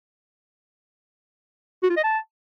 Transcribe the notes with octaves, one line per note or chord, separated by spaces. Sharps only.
F#4
F4
D#5
A5